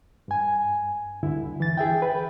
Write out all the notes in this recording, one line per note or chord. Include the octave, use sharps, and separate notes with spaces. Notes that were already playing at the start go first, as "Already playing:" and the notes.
G2 G#5
D2 G2 D3 E4
E3 A6
G#4 E5 G5
B4 G5